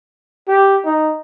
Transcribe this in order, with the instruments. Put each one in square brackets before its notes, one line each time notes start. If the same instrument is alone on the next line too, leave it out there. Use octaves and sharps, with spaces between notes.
[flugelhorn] G4
D#4